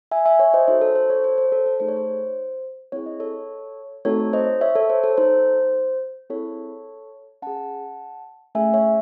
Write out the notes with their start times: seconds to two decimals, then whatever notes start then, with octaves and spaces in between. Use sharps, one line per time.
0.11 E5 G#5
0.26 E5 G#5
0.39 C#5 E5
0.54 C5 D#5
0.68 D#4 F#4 A4 C5
0.81 A4
0.95 C5
1.10 A4 C#5
1.24 C5
1.38 C5
1.52 A4
1.66 A4
1.80 A3 D#4 G#4 C5
1.88 C#5
1.96 C5
2.92 C4 E4 G#4 C#5
3.06 D#5
3.20 A4 C#5
4.05 A3 C4 D#4 F#4 A4 C#5
4.33 C5 D#5
4.61 C#5 E5
4.75 A4 C#5
4.90 C5
5.04 A4
5.17 D#4 A4 C5
6.30 C4 E4 G#4 A4 C#5
7.42 C#4 G#4 F#5 A5
8.55 A3 C#4 G#4 E5 G#5
8.74 C#5 E5